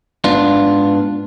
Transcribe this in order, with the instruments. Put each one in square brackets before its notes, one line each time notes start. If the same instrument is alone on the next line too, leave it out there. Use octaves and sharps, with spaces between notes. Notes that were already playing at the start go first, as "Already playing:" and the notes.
[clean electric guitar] G#2 B3 D4 F4